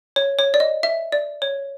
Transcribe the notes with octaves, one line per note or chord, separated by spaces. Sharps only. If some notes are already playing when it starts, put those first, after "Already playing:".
C#5
C#5
D5
D#5
E5
D5
C#5